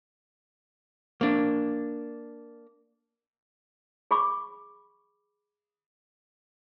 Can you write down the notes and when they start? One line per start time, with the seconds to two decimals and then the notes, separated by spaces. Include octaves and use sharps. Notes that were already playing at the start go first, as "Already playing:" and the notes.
1.21 A#3 D4
4.11 G#4 B5 C#6 D6